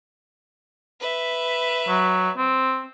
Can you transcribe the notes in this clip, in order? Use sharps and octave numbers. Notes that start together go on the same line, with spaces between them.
B4 E5
F#3
C4